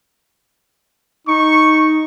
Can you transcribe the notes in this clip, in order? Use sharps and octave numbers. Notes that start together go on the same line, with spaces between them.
D#4 C#6